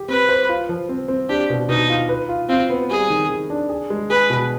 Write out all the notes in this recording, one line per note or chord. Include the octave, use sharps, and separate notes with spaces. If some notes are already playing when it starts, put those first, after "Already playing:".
Already playing: G4
C4 B4
C5
F4
F3
C4
C4
D4 G4
B2
B2 D#4
F4
B4
F4
C4 F4
B3
G3 G#4
D#3
D#3
D4
G#4
G#3
G#4 B4
B2